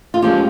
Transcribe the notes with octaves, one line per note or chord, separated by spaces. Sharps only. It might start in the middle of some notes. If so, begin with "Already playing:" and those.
F4
A#2 F3 G#3 C#4 G4